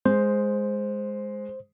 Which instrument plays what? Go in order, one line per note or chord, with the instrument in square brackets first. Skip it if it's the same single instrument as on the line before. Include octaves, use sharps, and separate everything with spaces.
[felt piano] G#3 [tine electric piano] C5